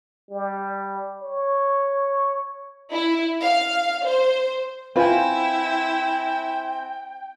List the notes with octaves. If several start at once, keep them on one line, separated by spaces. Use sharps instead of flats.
G3
C#5
E4
F5
C5
C4 E4 F4 B4 G5 G#5